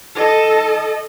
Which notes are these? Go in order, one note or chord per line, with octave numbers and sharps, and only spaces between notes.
A4 D#5